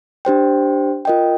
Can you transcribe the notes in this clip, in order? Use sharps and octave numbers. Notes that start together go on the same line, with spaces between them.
D4 G4 C5 G5
F4 A#4 D#5 G5